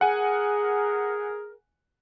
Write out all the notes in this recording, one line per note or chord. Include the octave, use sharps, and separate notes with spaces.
G#4 A#4 F#5 G#5